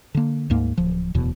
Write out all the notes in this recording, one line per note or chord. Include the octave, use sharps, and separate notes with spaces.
D3 A#3
D2 G#2 A#3
D1 F3
D1 E2 B2